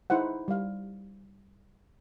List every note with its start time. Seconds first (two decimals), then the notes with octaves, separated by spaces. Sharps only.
0.10 D#4 E4 G#4 C5 F#5
0.48 G3 F5